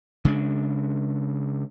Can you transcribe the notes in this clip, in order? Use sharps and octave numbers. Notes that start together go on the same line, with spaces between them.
C#3 G#3 D4